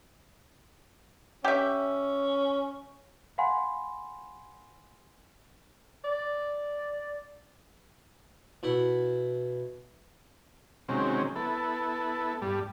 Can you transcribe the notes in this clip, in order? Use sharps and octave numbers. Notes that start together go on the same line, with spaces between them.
C#4 G4 E5
F5 F#5 G#5 B5 C6
D5
B2 E4 F#5
C3 D#3 F#3 G#3 C4 C#4
B3 E4 A4
G2 G3